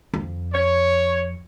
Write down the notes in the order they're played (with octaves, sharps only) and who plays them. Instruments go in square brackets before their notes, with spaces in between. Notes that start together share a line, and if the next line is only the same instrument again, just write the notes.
[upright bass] F2
[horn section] C#5